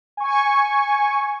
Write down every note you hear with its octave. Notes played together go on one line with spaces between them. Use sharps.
G#5 C#6